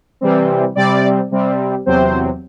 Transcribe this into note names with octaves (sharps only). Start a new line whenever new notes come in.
C3 E3 G3 C4
C3 G3 C4 D5
C3 G3 C4
E2 C3 F#3 C4 C5